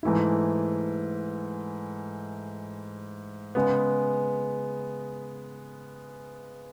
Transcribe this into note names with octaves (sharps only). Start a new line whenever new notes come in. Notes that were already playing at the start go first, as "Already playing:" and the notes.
G#2 E3 A3 E4
C#3 G#3 B3